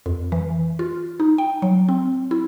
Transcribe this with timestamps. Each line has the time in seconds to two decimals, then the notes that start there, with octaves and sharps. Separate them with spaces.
0.06 F2
0.32 E3
0.79 F4
1.20 D#4
1.38 G5
1.62 F#3
1.89 C4
2.31 E4